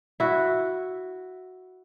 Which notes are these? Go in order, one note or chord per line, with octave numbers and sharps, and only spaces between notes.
E4 F#4